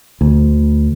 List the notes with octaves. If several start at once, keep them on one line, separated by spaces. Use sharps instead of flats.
D2